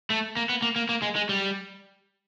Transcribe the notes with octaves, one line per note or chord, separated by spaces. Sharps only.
A3
A#3
B3
A#3
A#3
A#3
G#3
G#3
G3